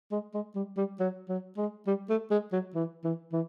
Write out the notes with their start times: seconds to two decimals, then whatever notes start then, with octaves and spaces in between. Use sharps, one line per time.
0.12 G#3
0.34 G#3
0.56 G3
0.77 G3
1.00 F#3
1.29 F#3
1.57 G#3
1.87 G3
2.10 A3
2.31 G#3
2.52 F#3
2.75 E3
3.04 E3
3.33 E3